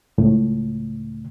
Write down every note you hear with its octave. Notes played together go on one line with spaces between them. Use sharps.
C#2 A2